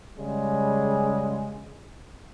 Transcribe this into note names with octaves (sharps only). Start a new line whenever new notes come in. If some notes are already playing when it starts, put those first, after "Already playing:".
C#3 G3 G#3